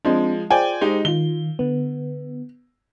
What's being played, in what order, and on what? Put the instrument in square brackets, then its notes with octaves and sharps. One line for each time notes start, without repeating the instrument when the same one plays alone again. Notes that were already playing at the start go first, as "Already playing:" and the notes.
[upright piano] F3 G#3 [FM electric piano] C4 D4
[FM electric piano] F4 G#4 C5 [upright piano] D5 G5 G#5
[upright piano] G#3 D#4 G4
[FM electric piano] D#3 F4 [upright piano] G7
[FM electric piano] D3 B3